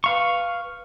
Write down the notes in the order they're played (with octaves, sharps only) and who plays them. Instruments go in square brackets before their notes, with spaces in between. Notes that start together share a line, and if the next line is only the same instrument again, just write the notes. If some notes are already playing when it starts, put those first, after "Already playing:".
[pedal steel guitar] B4 F5 C#6